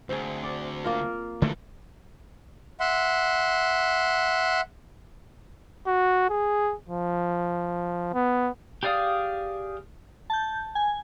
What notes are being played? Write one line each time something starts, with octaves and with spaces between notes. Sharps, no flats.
D2 C4 G#4
D5
A#3 F4 A#4
D3 E3 F#3 A3 A#3
E5 F#5 C6
F#4
G#4
F3
B3
G4 G#4 D5 F5 D#6
A5 G6
G#5